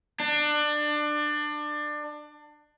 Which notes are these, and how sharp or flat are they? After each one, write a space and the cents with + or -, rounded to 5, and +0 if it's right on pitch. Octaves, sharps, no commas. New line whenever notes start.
D4 +25